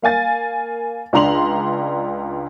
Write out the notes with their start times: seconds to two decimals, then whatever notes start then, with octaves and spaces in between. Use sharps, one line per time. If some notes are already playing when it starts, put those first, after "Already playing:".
0.02 A#3 F5 G#5 A6
1.13 C#2 D4 A#5 C6 F7 F#7